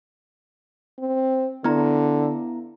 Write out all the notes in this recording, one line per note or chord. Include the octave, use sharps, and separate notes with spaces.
C4
D3 B3 E4 A#5